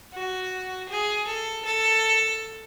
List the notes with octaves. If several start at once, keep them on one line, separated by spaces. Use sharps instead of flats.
F#4
G#4
A4
A4